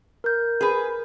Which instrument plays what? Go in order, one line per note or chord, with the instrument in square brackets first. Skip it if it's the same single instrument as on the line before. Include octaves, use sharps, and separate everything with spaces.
[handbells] A#4 G6
[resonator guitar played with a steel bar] G#4 B4